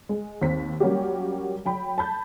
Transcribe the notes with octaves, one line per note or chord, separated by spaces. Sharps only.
G#3
D#2 C4 B6
F#3 G3 A#3 C#4 F#4 G4
F#3 G5 B5
A5 B5 G6